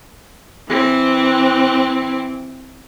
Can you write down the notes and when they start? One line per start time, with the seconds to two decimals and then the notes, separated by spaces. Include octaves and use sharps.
0.69 E3 C4